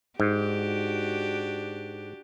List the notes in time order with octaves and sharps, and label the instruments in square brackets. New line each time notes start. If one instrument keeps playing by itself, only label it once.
[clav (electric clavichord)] G#2 [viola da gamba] D4 F#4 G4